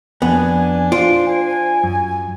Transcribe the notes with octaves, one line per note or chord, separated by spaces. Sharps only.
F2 B3 D4 G#5
F4 C5 D7
G#5
F#2